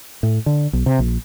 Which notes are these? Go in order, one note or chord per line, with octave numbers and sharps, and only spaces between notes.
A2
D3
B1
C3
A#1